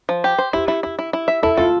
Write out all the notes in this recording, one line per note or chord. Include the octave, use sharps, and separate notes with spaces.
F3
G4
C5
E4 G4
E4
E4
E4
E4
E5
E4 A4
F4 A4